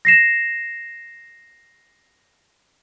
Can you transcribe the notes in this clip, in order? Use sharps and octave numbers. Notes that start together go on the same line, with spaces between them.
A#6 C7 E7